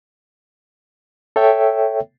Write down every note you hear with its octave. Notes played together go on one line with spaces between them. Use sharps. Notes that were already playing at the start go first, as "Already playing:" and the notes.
A4 C#5 E5 G5